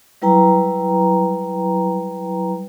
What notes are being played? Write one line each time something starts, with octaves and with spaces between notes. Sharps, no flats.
F#3 G3 E4 B4 G5 A#5